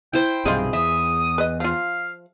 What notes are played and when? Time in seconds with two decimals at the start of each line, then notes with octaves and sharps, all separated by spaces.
0.13 E4 C5 G5
0.45 B1 G2 C3 E3 D#4 F4 G#4
0.73 E2 E5 D#6
1.38 B4 D#5
1.60 F3 F4 F5